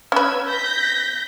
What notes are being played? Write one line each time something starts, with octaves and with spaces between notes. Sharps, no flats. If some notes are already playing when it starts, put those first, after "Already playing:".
C#4 B4 E6 G#6
G6 A#6 B6